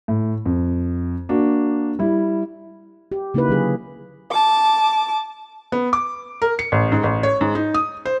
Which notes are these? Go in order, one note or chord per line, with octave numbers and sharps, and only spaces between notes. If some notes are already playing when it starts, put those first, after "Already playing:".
A2
F2
A#3 D4 F#4
G3 E4
G4
C#3 A#3 D#4 E4 B4
D3 F#3 G#4
A5 D6
B3
D6
A#4
C#7
A1
G#2
A1
C#5
G#2
D#4
D#6
C5